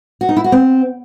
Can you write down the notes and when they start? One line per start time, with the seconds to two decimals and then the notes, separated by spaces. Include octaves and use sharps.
0.21 F#4
0.29 D#4
0.37 E4
0.44 F#4
0.52 C4